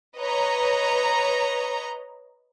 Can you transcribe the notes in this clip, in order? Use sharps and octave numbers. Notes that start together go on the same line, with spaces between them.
B4 C#5 D#5 A#5